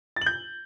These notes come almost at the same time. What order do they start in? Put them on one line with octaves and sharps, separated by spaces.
A6 F#7 G6